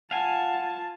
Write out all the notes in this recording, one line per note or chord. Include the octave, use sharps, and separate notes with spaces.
F4 F5 F#5 G#5 A5